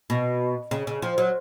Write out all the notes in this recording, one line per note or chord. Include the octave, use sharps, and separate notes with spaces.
B2
C#3
C#3
F3
F#3